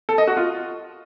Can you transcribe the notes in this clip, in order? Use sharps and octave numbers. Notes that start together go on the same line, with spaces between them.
A4
D#5
F#4
F4